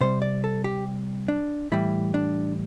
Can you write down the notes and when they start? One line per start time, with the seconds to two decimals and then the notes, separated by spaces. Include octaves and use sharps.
0.01 C3 G3 C5
0.22 D5
0.44 A4
0.64 G4
1.28 D4
1.72 A2 E3 G3 E4
2.14 D4